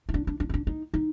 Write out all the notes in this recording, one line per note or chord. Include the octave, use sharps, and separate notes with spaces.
D#4
D4
D4
D4
C4
D4
D#4
D#4